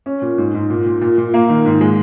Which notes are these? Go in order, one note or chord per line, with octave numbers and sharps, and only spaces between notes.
C#4
A#2
G#2
G#2
A#2
A#2
A#2
A#2
A#3
D#3
G#2
G#3